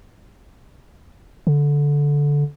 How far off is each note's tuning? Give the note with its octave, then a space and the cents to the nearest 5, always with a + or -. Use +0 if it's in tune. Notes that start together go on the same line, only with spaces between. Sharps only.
D3 -15